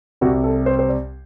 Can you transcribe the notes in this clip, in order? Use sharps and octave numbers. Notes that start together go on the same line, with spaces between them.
C2 C3 G3 F#4
A4
C5
C5
D5